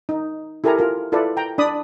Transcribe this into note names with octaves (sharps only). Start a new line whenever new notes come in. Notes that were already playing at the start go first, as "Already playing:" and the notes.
D#4
E4 G4 A4 A#4 G#5 A#5
F4 A#4
E4 F4 A4 B4 D5
G5 A#5
D4 D5 B5 D#6